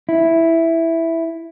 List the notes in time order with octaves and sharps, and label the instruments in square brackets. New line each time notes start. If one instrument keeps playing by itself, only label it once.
[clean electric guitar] E4